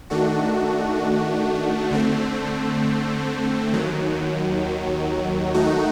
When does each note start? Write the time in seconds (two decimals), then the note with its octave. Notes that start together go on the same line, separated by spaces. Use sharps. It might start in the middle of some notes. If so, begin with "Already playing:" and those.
0.10 D#3 A3 D4 F#4
1.91 D3 A3 C4
3.73 D#2 D#3 F#3
5.54 D#3 A3 D#4 F#4